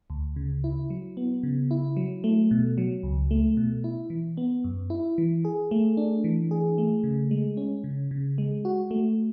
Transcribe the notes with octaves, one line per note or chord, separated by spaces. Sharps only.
D2
C#3
E4
F#3
B3
C#3
E4
F#3
A3
B2
F#3
C#2
A3
B2
E4
E3
B3
F#2
E4
E3
G#4
A3
D4
E3
G#4
A3
C#3
G#3
C#4
C#3
C#3
G#3
F#4
A3